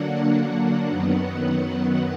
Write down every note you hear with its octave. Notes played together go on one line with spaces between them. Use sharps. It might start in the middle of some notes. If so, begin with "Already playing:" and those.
Already playing: D3 F#3 A#3 D4 F#5
F#5
F#2 D#3 F#3 B3